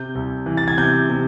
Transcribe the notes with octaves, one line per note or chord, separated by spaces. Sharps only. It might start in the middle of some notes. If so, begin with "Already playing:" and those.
Already playing: C3 G6
C2
E3
A6
G#6
C3 G6
C3